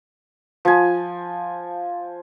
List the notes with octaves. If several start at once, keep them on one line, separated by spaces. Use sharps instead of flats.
F3 G#5